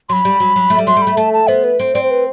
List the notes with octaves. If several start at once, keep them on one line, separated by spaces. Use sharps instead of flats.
F#3 B5 C6
G3
F#3
F#3
A3
G3
F#3 C6
G3
B5
A3
A3 A5
A5
B3 C5
B4
C4 C5
C4 D5
C5
B4